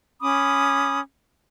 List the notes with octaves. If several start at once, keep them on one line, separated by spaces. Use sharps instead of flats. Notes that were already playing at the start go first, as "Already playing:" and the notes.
C#4 B5 D6 D#6